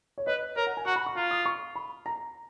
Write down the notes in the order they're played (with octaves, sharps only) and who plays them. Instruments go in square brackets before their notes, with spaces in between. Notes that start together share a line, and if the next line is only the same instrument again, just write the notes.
[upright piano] C#5
[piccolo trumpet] B4 [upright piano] D#5
[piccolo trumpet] A#4 [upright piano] C#5
[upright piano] F#5
G#5
[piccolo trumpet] F#4 [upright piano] A#5
[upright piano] B5
C#6
[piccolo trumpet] F4 [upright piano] A#5
[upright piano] D#6
C#6
B5
A#5